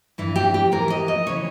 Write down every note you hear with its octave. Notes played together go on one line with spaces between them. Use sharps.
G2 E3 E4
G4
G4
G#2 E3 A#4
D#5
D#5
C#3 E3 C#5